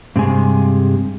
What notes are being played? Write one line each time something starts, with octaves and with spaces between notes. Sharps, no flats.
G2 C3 G#3 G#5